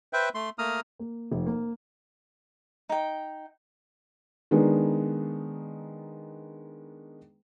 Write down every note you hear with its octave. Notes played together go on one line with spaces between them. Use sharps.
B4 C5 E5 G5
A3 C6
A3 A#3 A#5 D#6 F6
A#3
F1
A#3
D#4 G5
D#3 G#3 B3 D4 D#4